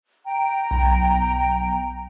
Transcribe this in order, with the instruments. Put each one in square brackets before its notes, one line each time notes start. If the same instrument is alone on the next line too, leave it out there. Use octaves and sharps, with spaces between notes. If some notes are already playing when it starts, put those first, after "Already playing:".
[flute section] G5 A#5
[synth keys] B1